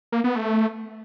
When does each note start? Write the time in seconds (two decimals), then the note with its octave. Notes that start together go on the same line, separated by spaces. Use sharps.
0.12 A#3
0.24 B3
0.36 A3